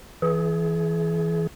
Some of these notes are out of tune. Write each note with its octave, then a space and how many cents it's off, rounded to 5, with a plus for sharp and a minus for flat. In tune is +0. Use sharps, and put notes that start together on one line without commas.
E3 +0 G#4 +30